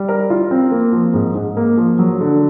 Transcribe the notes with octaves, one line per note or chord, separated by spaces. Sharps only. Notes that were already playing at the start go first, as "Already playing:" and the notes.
Already playing: G3
A#4
F4
C4
A#3
F3
G#2
G#2
A#3
F3
F#3
D3